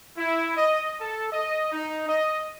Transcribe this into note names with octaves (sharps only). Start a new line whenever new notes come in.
E4
D#5
A4
D#5
D#4
D#5